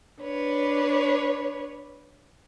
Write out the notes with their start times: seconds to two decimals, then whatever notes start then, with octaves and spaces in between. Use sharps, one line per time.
0.23 D4 B4 C#5